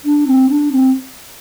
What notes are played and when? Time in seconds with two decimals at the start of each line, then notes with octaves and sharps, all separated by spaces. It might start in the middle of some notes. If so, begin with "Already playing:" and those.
0.05 D4
0.27 C4
0.49 D4
0.72 C4